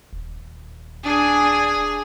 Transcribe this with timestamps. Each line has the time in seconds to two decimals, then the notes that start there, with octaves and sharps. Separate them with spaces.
0.13 D#1
1.04 D4 G#4 G#5